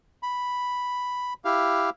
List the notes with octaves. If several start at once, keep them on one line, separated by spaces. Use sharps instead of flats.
B5
E4 G4 F5